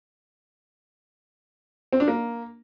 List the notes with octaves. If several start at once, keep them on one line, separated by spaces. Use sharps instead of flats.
C4
D4
A#3